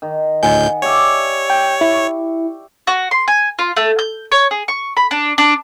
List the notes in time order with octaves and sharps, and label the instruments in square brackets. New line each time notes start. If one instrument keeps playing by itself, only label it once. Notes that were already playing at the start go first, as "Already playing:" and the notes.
[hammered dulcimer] D#3
[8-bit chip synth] D2 A2 G6 [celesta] D#5 G#5 [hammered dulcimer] F#5
[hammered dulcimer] G4 D5 E5 [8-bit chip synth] C#5
[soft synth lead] G5
[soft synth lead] E4 [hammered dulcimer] C#6
[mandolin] F#4
C6
G#5
F4
A3
G6
C#5
G#4
C#6
B5
D4
D4